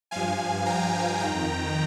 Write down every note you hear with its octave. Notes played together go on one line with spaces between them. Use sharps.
G2 F3 F5 G#5
G5 A#5
F2 D#3 G5 A#5